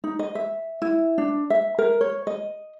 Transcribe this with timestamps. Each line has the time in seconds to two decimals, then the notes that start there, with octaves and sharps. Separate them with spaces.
0.04 D#4
0.19 D#5
0.35 E5
0.82 E4
1.18 D4
1.50 E5
1.78 A#4
2.01 C#5
2.27 D#5